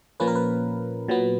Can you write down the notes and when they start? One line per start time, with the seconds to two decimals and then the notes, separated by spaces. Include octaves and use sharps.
0.20 A#2 F3 A#3 C#4 B4
0.28 A#4
0.35 B4
1.08 A#2 F#3 B3